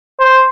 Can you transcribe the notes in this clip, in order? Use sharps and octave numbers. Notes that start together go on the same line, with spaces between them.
C5